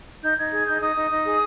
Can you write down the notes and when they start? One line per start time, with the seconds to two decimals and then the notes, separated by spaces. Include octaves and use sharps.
0.22 D#4 G6
0.37 D#4 G#6
0.52 G#4 G#6
0.67 D#4 G6
0.81 D#4 D#6
0.95 D#4
1.10 D#4
1.25 G#4